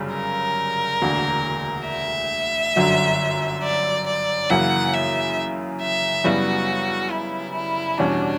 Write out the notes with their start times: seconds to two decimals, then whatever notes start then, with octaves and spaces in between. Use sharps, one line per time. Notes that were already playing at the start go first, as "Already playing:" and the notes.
Already playing: G1 F#2 C#3 G3
0.15 A#4
1.02 E1 D2 D3 A#3
1.89 E5
2.76 G1 F#2 D3 F#3
3.63 D5
4.07 D5
4.50 F#2 C#3 E3 A#3 E4 F#5
4.94 E5
5.81 E5
6.24 F#2 C#3 G3 B3 E4 F#4
7.11 E4
7.55 E4
7.98 E2 B2 G3 C#4 D4